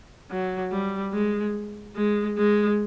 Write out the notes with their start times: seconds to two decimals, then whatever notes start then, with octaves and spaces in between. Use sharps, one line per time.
0.30 F#3
0.72 G3
1.13 G#3
1.96 G#3
2.38 G#3